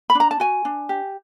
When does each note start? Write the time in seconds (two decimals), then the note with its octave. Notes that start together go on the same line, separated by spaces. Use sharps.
0.10 B5
0.15 D4 A#5
0.31 A5
0.40 F#4 G#5
0.65 D4
0.89 G4